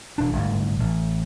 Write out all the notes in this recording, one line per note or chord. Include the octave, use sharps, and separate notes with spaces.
E1 D4
G1 D2 G#2
A1